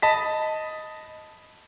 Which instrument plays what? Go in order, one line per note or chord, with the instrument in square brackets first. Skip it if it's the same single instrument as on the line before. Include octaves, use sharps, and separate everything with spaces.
[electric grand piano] D#5 A5 B5 B6